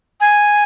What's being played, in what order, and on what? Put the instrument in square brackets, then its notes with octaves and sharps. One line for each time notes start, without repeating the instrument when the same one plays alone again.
[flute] G#5